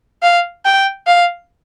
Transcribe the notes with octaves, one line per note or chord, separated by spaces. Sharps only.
F5
G5
F5